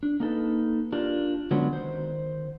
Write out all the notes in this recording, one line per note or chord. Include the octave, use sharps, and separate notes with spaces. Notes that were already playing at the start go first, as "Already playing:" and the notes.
D4
A#3 D#4 A4 B4
D4 F4 G4 A#4
D3 F#3 G#3 B3 C#4 D4
D#3 C5